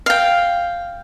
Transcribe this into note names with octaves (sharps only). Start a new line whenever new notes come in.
F5 G5